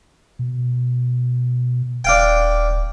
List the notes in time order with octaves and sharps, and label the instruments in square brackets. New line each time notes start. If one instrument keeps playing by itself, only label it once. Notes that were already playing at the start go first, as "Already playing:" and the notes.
[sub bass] B2
[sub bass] D#1 [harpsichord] D4 F5 G5